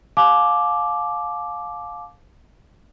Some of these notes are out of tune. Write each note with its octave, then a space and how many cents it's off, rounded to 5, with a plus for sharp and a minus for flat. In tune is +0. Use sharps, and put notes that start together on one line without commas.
F5 +20 A5 -40 D6 +0